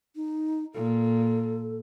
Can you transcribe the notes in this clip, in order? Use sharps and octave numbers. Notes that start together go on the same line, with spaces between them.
D#4
A#2 A4